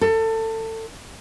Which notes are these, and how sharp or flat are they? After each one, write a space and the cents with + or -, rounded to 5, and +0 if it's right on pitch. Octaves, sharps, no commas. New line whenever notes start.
A4 +25